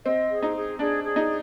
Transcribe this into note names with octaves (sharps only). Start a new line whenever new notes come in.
C4 D#5
G#4
D#4
G#4
D4 G#4
G#4
D#4